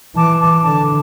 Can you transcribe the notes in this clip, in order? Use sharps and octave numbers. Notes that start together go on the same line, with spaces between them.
E3 A5 D6
A5 D6
D3 A5 D6